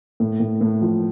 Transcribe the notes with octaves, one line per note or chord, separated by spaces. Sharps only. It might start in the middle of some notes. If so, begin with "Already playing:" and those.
A2
A2
A2
F3